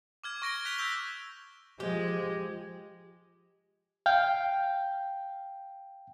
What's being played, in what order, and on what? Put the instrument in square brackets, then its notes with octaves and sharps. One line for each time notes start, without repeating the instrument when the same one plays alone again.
[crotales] D6 F6 G#6
C#6 A#6 D7 G7
F#6 A#6 B6 F7 G7
E6 G6 B6 F7 G7
[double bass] F3 [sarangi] G#3 [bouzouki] G4
[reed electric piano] F5 G5